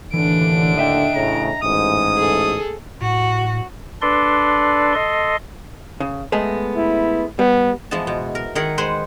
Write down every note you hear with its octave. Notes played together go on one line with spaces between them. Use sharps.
D#2 A2 D3 E3 D4 D7
D#5 E5 G5
A1 A2 C#3 A#5
A1 G#2 D#6
G#4 A4
A2 F#4
D4 A4 B4 D5 C6
A4 D#5 C6
C#3
G#3 A3 B3
E4
G3 B3
E3 F3 G#3 B3 A5
B2
A#4
D#3 D#4 G#4 A#4 F#5 G#5
G#3 B4 C5 F#5 G#5 C6